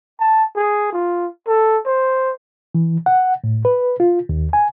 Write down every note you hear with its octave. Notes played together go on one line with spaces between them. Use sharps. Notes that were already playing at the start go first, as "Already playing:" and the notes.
A5
G#4
F4
A4
C5
E3
F#5
A2
B4
F4
D#2
G#5